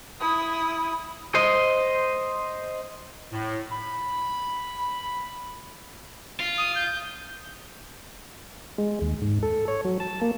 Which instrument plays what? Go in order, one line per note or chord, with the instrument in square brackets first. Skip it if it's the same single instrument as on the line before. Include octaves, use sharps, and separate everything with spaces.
[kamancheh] E4 D#6
[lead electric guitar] C5 D#5
[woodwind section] A2
B5
[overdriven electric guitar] F4
[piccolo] D#6
G6
[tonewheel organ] G#3
D#2
G#2
A4
C#5
F#3
A5
A#3